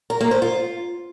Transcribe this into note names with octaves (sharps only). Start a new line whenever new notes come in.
A#4
A#3
C5
F4